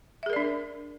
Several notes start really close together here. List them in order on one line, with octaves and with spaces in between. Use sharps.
E5 G#4 A#4 D5 D4